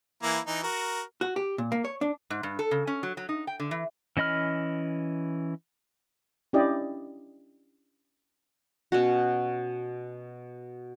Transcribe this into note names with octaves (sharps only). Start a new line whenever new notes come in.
E3 A#3 E4
E3 D#4
F#4 A#4
F#4
G4
A#2
A#3
C#5
D4
G#2
G2
A4
C#3
C#4
F#3
F#3
D#4
G5
D3
E3
E3 C#4 D#5 B5 F6
C#4 D4 E4 G4 D5 D#5
B2 C#4 F#4